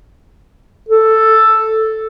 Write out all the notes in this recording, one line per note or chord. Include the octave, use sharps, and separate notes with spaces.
A4